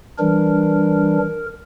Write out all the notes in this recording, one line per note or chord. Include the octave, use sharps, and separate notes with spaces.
E3 G3 D4 A#4